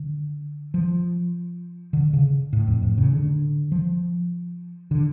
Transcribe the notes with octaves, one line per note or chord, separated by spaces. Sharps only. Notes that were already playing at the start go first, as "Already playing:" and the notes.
Already playing: D3
F3
D3
C#3
A2
F2
A2
C#3
D3
F3
D3